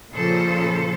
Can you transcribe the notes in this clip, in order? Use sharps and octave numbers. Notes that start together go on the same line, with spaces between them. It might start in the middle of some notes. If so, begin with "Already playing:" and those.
A#2 C#3 F3 A4 C5